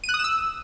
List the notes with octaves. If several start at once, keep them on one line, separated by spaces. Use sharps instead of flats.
D#7
F#6
D#6
E7
E6